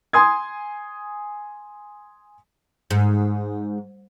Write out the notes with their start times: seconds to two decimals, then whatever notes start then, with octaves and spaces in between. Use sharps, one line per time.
0.13 G#5 C6 D#6 G#6
2.91 G#2